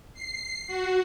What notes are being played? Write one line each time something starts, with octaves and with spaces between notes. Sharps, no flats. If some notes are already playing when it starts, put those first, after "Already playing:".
C7
F#4